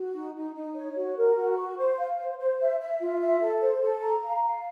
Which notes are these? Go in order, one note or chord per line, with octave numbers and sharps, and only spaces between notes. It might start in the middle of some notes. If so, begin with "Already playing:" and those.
Already playing: F#4
D#4
D#4
D#4
C#5
F#4
A#4
F#4
C#6
C5
F5
C5
C5
E5
E5
F4
E5
A4
C5
A4
A#5
F5
F5